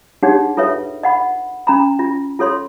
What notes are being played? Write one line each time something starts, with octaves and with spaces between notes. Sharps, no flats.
D4 D#4 G4 G#4 C#5 F#5
F4 A4 B4 C#5 E5
D#5 F#5 B5
C#4 A#5 B5
F4
F4 A4 C#5 C6